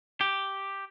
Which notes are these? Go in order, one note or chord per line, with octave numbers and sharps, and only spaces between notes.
G4